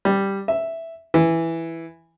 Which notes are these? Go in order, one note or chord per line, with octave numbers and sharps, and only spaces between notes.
G3
E5
E3